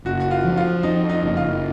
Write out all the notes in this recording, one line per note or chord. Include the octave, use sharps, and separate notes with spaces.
F#1 F#4
F#4
F4
F3
F4
F2 D#4
D#4
F#1
F4